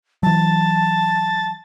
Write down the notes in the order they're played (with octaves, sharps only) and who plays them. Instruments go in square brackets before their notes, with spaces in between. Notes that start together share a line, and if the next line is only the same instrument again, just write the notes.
[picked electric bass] E3 F#3 [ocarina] A5 [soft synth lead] A6